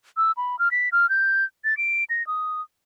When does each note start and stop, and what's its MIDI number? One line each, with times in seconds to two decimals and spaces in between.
0.17 0.32 88
0.37 0.59 83
0.59 0.71 89
0.71 0.89 95
0.92 1.09 89
1.10 1.45 91
1.65 1.77 93
1.77 2.04 98
2.10 2.26 94
2.27 2.62 87